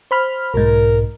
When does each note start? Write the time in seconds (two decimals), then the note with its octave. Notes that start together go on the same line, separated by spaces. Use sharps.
0.11 C5 B5 F6
0.54 B1 G#2 A#4